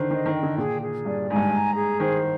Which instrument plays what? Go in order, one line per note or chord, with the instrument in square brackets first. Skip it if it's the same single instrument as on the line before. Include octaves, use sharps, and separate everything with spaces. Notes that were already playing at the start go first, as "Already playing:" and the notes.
Already playing: [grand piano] D3 D#3 [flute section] C5
[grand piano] D#3 [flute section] D#5
[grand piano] D#3
[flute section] G5
[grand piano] D3
[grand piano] A#2 [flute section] G#4
[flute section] G#4
[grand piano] G2 [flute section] D5
[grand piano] G#2 [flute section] G#5
[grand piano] G2
[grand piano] G#2 [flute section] A#5
[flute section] G#4
[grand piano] D#3 [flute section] C5